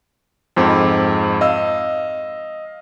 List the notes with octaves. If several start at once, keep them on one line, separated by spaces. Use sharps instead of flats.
F2 G#2 C4
D#5 F5 E6